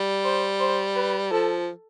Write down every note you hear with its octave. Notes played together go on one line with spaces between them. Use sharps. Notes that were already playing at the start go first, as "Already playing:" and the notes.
Already playing: G3
C5
C5
B4
F3 A4